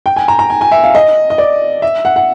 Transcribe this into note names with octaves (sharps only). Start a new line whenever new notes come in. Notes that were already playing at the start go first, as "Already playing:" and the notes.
G5
G#5
A#5
A#5
G#5
G#5
E5
F5
D#5
D#5
D5
E5
F#5
F#5